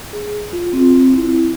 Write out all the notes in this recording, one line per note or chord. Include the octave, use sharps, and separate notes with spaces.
G#4
F4
C4
E4